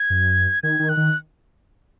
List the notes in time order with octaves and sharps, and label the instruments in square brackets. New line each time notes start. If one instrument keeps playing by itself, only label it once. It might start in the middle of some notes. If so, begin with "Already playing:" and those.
Already playing: [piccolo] G#6
[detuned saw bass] F#2
[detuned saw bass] D#3 [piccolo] G#6
[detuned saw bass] D#3
[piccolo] F#6
[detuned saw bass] D#3